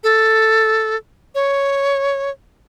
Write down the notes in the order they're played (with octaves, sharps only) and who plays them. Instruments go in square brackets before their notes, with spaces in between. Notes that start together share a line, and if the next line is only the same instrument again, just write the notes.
[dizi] A4
C#5